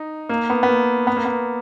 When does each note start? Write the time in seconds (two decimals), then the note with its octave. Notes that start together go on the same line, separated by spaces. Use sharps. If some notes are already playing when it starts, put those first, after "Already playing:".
Already playing: D#4
0.29 A#3
0.50 B3
0.63 B3
0.69 A#3
1.07 B3
1.17 A#3
1.25 B3